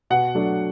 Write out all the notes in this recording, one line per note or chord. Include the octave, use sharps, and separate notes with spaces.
B2 F#5
F#3 A3 D4